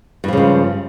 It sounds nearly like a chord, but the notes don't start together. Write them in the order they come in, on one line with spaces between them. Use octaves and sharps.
G2 F3 C#3 G#3